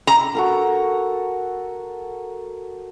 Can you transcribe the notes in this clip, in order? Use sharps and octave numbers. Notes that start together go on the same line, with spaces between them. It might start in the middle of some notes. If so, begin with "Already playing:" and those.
A#5
F#4 A4 A#4